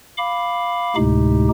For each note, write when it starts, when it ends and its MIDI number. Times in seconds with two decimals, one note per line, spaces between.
0.17 0.95 77
0.17 0.95 83
0.17 0.95 86
0.96 1.49 38
0.96 1.49 45
0.96 1.49 48
0.96 1.49 56
0.96 1.49 63
0.96 1.49 67